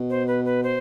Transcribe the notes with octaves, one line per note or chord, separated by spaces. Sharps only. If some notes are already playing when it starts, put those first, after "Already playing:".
Already playing: B2
C5
B4
B4
C5